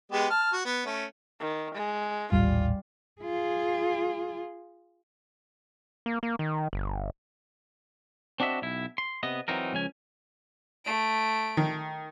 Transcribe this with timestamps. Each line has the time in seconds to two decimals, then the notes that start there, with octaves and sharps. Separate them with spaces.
0.12 G#3 B3 G4
0.30 A5 F6
0.53 F#4
0.66 B3
0.86 A3 C#4
1.40 D#3
1.75 G#3
2.32 D#1 A1 G3 F4
3.22 F4 G#4
6.06 A#3
6.23 A#3
6.39 D#3
6.73 G1
8.40 C4 D4 F#4 D#5 E5
8.62 B1 E4
8.98 C6
9.23 C3 B3 D#5
9.48 E3 F#3 C4 D#4 A#4
9.73 C#2 F3 C#4 G#5
10.85 A3 D7
11.57 D#3